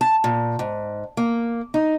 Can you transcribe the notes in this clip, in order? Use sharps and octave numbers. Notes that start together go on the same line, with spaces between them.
A5
A#2
G#2
A#3
D#4